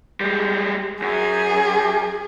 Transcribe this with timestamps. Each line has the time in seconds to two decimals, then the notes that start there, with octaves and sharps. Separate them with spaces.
0.20 G3 G#3
1.02 F#2 G#4